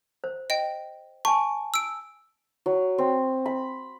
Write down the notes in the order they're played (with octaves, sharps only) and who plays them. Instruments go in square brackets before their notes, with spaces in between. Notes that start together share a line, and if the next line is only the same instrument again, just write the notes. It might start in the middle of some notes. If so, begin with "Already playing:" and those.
[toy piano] C5
[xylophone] D#5 G5
[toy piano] G#5 A5 [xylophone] C#6
[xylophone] E6 D7
[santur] F#3
C4
B5